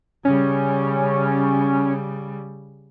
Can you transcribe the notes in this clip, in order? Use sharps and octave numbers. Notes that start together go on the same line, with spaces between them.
C#3 G3 C#4